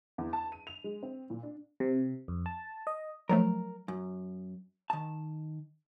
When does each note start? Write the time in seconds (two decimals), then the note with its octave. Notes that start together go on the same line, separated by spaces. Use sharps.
0.18 E2
0.33 A5
0.52 D#7
0.67 F7
0.84 G#3
1.03 C4
1.30 A#2
1.43 D4
1.80 C3
2.28 F2
2.46 A5
2.87 D#5
3.29 F3 F#3 A3 A#4
3.88 F#2
4.90 D#3 A5